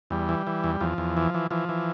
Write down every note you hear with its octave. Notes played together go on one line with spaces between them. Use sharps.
E2 G3
E3
E3
E2
E2 F3
E2
E3
E3
E3 F3
E3